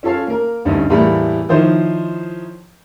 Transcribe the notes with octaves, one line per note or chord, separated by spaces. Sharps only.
C#4 F4 A4 C#5 F5
A#3 A#4
D2 G2 C#4 D#4
E2 A2 G3 A3 A#3 B5
D#3 F3 D#4 E4 C5 C#5